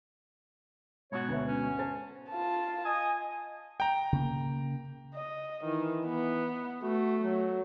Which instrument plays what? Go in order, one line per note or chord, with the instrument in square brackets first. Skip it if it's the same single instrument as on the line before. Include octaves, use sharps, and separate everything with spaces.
[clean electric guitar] G#2 B2 F#4 [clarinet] C#5
[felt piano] D2 B3 E5
[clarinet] C#4
[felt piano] C5 A5 A6
[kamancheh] F4 A5
[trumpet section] D#5 G#5 D#6
[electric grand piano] G5 A#5
[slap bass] C#3 A#3
[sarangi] D#5
[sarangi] D#3 [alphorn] E3
[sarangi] B3
[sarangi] A3 [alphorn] F#4
[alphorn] F#3